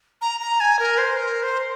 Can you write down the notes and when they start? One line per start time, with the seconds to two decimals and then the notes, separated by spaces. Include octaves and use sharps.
0.21 A#5
0.41 A#5
0.60 G#5
0.79 A#4
0.98 C5
1.17 A#4
1.43 C5